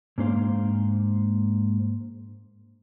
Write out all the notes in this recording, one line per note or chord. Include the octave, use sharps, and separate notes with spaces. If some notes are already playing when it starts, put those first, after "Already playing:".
G#2 A#3 D4 C5 F5